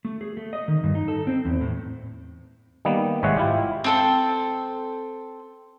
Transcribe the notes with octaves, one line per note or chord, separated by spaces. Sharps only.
A3
G#4
A3
D#5
D#3
G2
D#4
A4
C4
E2
A2
D#3 G3 A#3 B3
G#1 C3 G#3 C#5 E5 F#5
E4 F4 G4
C4 A4 C5